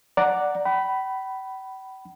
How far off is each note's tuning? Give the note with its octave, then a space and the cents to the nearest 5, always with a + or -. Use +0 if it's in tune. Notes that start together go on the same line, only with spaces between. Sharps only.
D5 +0 F#5 +0 A#5 +0
G5 -45 B5 +0